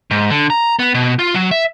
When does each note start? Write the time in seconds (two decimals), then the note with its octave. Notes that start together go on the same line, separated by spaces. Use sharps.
0.11 G#2
0.30 D3
0.50 A#5
0.79 B3
0.94 B2
1.19 F4
1.34 F#3
1.51 E5